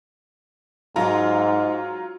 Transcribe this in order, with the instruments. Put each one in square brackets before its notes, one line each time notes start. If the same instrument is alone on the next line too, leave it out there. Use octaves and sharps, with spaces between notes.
[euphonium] G#2 [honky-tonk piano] F#3 F4 A#5